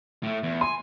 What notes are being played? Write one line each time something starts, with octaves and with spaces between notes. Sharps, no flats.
A2 A3
E2
G#5 C6